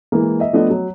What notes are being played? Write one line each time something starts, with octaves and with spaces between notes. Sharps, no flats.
E3 G#3 A#3
D#5 E5
F3 A3 B3 D4 D#5
F#3